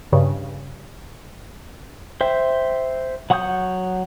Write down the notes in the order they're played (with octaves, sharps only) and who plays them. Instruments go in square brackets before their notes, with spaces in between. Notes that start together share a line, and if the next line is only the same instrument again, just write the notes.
[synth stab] G2 C#3
[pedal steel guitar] C5 E5 G5
F#3 F#5 C#6 D#6 G6